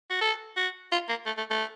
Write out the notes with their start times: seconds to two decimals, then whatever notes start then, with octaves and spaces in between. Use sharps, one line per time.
0.10 F#4
0.21 A4
0.57 F#4
0.92 F4
1.09 A#3
1.26 A3
1.37 A3
1.50 A3